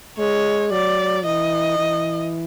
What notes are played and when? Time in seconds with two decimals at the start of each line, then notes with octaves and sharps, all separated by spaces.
0.18 G#3 C#5
0.72 F#3 D5
1.25 E3 D#5
1.79 E3